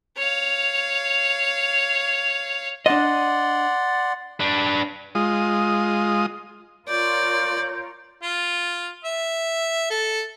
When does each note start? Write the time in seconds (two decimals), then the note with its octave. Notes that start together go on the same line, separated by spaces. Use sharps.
0.17 C#5 F5
2.86 D4 D5 D#5 F#5 C6
4.40 D4 B4
5.15 G#3 F4 D#6
6.89 F4 A#4 C#5 D5 G6
8.23 F4
9.05 E5
9.90 A4